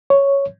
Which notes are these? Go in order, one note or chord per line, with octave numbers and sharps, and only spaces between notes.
C#5